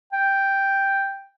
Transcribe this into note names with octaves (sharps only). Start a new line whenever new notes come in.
G5